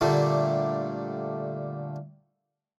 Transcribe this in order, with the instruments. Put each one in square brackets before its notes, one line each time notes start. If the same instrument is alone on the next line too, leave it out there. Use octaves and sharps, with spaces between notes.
[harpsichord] A#2 D3 G3 A3